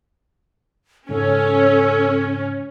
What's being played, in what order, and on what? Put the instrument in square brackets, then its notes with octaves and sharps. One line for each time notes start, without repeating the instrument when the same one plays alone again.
[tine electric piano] G#2 C#3 [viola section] C#4 [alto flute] A4